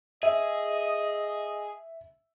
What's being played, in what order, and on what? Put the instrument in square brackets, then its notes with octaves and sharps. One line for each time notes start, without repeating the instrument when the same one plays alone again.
[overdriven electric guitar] G#4 [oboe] D#5 [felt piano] E5